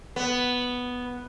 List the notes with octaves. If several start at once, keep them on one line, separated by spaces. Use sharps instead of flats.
B3